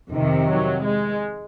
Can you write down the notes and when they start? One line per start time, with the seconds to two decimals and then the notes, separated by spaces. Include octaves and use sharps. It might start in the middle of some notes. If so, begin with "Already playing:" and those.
0.11 F2 C3 D#3
0.47 F#3
0.84 G#3